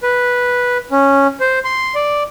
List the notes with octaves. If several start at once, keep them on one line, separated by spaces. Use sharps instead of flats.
B4
C#4
C5
C6
D5